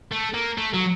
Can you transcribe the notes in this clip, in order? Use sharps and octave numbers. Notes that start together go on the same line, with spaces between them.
A3
A#3
A3
F#3